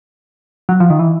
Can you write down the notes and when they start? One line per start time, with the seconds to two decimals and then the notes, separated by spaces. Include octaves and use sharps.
0.69 F#3
0.80 F3
0.90 D#3
0.99 E3